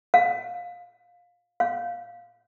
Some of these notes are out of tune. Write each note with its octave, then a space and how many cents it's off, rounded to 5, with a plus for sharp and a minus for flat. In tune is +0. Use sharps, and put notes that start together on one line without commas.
F5 +15
F5 +5